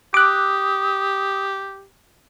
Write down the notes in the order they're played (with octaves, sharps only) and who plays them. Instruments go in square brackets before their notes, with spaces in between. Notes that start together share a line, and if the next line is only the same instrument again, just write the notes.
[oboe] G4 [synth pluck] D6 F#6 [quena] D#6